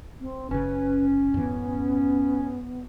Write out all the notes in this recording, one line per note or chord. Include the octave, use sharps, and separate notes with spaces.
C4
F#1 C#3 C#4 B4
F#2 A2 E3 B3